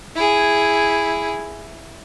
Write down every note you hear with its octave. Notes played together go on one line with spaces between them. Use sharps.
E4 G#4